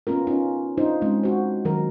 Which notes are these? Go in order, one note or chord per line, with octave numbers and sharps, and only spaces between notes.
B3 C#4 F4 A#4
C#4 D#4 F4
D4 D#4 F4 C5
G#3 C4 C#4
F#4 C5
D#3 F#3 A#4